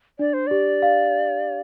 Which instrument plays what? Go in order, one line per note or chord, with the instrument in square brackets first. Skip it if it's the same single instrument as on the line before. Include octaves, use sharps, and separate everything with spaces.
[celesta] D4 [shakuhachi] D5
[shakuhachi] C5
[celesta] G4 [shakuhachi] D5
[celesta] F5